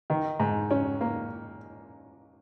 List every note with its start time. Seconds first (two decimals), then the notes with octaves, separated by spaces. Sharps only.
0.10 D#3
0.40 G#2
0.71 C#4
1.01 A#3